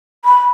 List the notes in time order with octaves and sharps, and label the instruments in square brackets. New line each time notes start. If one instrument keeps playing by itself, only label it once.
[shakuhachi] B5